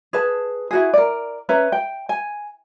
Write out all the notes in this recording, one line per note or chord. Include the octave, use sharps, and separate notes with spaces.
G#4 B4 A5
E4 F#4 G#4
A#4 D5
C#4 B4 E5 A#5
G5
G#5